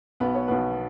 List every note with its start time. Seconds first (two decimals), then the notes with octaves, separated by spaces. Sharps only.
0.20 B1 B2 B3 B4
0.35 C#5
0.48 B1 B2 B3 B4